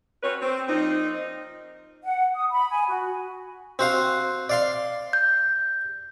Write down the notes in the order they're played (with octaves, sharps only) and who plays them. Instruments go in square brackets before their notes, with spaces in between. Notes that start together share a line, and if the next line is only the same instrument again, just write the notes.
[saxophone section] C4 C#4 F#4 B4 C#5
C4
A#2 F3 C4 D#4
[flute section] F#5
D#6
B5
G#5
F#4
[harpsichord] C4 F#4 F5
D5 F5 C6
[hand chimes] G6